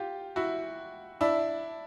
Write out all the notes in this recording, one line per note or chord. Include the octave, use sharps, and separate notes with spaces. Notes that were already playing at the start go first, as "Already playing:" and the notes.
Already playing: F4 G4
E4 F#4
D4 E4